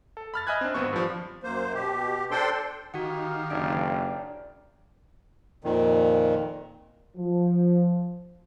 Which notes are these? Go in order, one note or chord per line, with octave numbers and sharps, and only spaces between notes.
A4
B5 F6 A6
D#5 E5 G#5 B5 F#6 G#6
C4 D4
G#1 B3 C4 C#6
G2 F3
F#2 A#3 C5
B2 G4
D4 A4 C5 G5 C6
D#3 F#4 G4 A#4 F5 F#5
F#1 D4 D5 G5
F2 A#2 D#3
F3